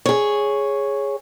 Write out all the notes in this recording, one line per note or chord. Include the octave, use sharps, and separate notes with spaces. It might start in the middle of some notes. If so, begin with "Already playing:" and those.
G#4 C#5